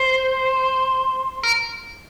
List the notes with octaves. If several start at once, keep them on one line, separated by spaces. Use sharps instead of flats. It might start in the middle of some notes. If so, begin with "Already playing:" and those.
Already playing: C5
A#4